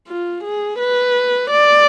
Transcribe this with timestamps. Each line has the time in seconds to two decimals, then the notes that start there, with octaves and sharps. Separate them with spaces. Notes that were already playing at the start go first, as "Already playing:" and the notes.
0.08 F4
0.44 G#4
0.79 B4
1.50 D5